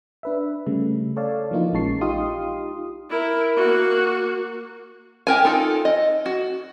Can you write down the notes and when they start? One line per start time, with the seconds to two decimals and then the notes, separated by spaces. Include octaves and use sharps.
0.23 D4 B4 E5
0.67 C#3 G3 A3
1.17 A4 C#5 D5 F5 A5
1.51 E3 F3 A#3 D#4 F4
1.73 A#1 G#3 C#4 A5 C#6 C7
2.01 D#4 F4 G4 F5 C6 D#6
3.10 E4 A#4
3.57 A#3 F#4
5.27 G4 A#4 G#5
5.45 D#4 F4 A4
5.85 D#5
6.26 F#4